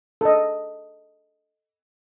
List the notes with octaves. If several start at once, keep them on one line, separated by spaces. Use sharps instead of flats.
A4 D#5